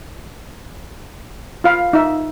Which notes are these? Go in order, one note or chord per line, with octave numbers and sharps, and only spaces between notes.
F4 F5 B5
D#4 E5